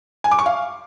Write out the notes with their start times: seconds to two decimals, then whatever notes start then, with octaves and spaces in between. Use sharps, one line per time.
0.24 G#5
0.31 D6
0.39 C#6
0.46 F5